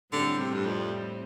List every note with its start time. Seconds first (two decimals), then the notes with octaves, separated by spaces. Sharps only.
0.13 A2 D3 G3 C4
0.39 C3
0.54 G2
0.65 F2